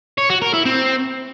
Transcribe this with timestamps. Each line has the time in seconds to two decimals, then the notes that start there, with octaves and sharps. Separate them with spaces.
0.18 C#5
0.30 F#4
0.42 A#4
0.54 E4
0.65 C4